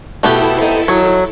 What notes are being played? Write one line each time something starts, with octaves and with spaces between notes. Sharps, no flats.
B2 A3 B3 E4 G4 A4
C4 D#4
D#3 F#3 C#5